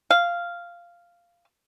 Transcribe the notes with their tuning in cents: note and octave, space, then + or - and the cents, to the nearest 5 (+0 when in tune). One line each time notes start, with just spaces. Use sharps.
F5 -10